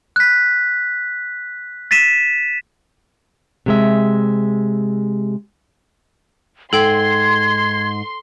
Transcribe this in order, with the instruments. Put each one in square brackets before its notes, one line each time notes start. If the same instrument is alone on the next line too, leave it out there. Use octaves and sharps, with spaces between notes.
[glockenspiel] F#6 B6
A6 B6 D#7 E7
[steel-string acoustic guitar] C3 G#3 E5
[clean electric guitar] G#2 [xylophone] A4 G5 [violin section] C6 [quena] G#6